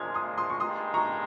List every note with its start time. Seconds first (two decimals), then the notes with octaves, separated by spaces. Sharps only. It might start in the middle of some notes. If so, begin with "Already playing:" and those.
Already playing: A#2 F3 G#3 F6 G#6
0.14 C6 D#6
0.37 C6 D#6
0.50 C#6
0.60 G2 D#3 G#3 C6 D#6
0.94 A#5 C#6